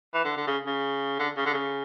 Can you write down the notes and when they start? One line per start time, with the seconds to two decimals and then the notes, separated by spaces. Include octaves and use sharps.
0.14 E3
0.25 D3
0.37 D3
0.47 C#3
0.66 C#3
1.19 D3
1.37 C#3
1.46 D3
1.54 C#3